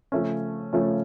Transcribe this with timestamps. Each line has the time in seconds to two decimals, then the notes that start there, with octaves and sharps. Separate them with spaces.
0.12 C#3 F3 A3 C#4
0.73 C#3 F3 A3 C#4